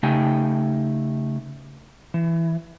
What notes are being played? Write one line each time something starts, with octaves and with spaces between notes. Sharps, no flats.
C#3 A3 D#4 G4 G5 G#5
E3